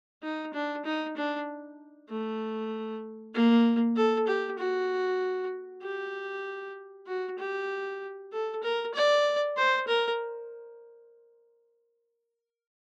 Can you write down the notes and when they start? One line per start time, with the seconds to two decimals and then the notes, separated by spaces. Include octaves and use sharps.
0.23 D#4
0.54 D4
0.85 D#4
1.16 D4
2.09 A3
3.34 A#3
3.96 A4
4.27 G4
4.58 F#4
5.83 G4
7.07 F#4
7.39 G4
8.32 A4
8.63 A#4
8.94 D5
9.57 C5
9.87 A#4